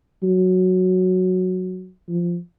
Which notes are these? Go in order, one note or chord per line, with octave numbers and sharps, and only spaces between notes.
F#3
F3